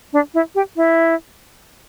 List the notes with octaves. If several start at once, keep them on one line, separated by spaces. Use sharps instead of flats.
D4
E4
G4
E4